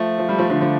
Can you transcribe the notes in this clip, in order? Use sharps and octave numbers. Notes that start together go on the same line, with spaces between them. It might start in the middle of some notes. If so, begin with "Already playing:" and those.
Already playing: F3 A3
F3
G3
F3 A3
D3 F3
D3 F3